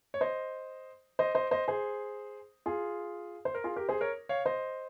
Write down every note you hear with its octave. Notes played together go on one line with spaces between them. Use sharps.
C#5
C5 D#5
C5 D#5
C5 D#5
C5 D#5
G#4 C5
F4 G#4
C5
A#4
F4 G#4
G4 A#4
G#4 C5
A#4 C#5
C#5 F5
C5 D#5